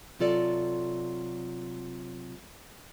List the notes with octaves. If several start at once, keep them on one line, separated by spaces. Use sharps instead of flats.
C3 F#3 F4 A4 D5